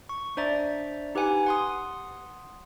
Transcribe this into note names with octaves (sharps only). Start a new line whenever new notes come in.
C#6
D4 C5 D5 E5 A#5 A6
D#4 G4 B4 F#5 G#5
F#5 C6 D#6